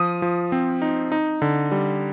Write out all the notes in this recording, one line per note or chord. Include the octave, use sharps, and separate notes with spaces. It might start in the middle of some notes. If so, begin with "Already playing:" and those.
Already playing: F3 F4 D#6
F3
C4
D#4
D#4
D3
G3